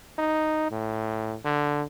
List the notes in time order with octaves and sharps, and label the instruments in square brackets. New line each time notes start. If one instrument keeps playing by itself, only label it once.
[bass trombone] D#4
A2
D3